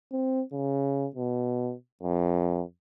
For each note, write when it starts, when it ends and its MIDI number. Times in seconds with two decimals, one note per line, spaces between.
0.12 0.42 60
0.53 1.07 49
1.15 1.74 47
2.03 2.62 41